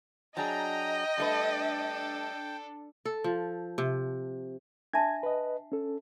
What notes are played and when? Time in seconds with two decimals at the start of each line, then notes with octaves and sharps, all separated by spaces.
0.37 F#3 D4 G#4 D#5 G5 A#5
1.18 G3 A3 D4 A4 B4
3.05 A4
3.24 F3
3.78 C3
4.93 D4 E5 A5 G#6
5.23 B4 D#5
5.72 C#4 A4